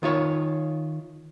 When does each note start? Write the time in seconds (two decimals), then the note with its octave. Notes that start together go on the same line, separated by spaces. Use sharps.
0.03 D#3 F4 C#5